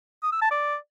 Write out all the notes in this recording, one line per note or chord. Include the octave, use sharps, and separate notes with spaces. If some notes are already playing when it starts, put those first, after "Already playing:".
D#6
E6
A5
D5